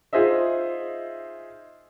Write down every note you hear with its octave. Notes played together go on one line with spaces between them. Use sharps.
D#4 F4 G#4 C5 D#5 E5